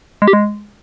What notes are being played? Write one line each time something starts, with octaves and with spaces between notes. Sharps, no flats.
G#3
G4
G#3